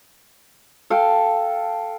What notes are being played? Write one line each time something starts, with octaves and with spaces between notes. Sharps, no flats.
A4 F5 G5